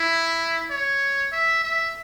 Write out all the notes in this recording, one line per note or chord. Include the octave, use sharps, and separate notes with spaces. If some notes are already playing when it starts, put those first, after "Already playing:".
Already playing: E4
C#5
E5
E5